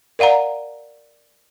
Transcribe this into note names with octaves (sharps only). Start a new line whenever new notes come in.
A#4 D5 F5 F#5 A#5